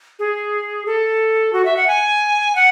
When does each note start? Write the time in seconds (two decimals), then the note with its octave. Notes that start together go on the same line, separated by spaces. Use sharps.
0.19 G#4
0.86 A4
1.53 F#4
1.65 E5
1.77 F#5
1.88 G#5
2.55 F#5